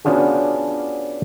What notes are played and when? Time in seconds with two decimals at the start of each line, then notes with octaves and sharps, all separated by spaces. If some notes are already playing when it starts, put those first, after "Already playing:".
0.05 B3 C#4 D4 F4 F#4 G#4